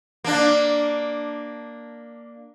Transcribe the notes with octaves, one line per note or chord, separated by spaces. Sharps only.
A#3 D4